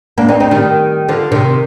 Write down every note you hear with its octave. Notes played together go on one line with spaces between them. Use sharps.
A#3 D4
C4 D#4
C4 D#4
D#3 G3
D3 F3
C3 D#3